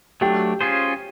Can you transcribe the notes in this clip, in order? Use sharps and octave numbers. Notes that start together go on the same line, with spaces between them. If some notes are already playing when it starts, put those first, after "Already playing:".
F#3 A3 D4 G4 G5
C#4 F4 G#4 C5